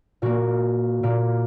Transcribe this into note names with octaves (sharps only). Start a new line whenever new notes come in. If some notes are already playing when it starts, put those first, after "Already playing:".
A#2 A#3 F#4
A#2 A#3